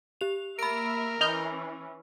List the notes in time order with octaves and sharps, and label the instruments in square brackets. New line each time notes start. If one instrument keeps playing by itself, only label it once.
[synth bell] G4 F7
[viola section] A#3 E5 [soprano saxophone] A#4 [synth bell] B5 D7
[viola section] E3 C#4 [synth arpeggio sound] D#5 F6 G6